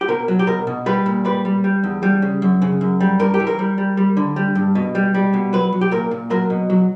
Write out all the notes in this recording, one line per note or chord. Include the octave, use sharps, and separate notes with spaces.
G4
B2 A#4
F#3
G4
B2 A#4
B2
G3 B4
A#2
G3 B4
G3
G3
E2
G3
C#3
F#2
C#3
F#2
G3
G2 A#4
G4
E3
A#4
G3
G3
G3
D3
G3
G2
B2
G3
G3
B2
F#3 B4
F#3
G4
A#2 A#4
A#2
F#3 A#4
B2
F#3